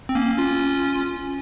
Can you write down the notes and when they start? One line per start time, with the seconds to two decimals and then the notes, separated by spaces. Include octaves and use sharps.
0.09 C4
0.15 A#3 C#4
0.38 C#4 F4